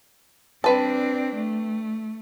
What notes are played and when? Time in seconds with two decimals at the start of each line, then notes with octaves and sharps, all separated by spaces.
0.64 G3 C4 D4 B4 A5
1.35 A3